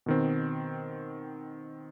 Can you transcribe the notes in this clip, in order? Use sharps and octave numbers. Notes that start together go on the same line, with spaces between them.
B2 D#3 C4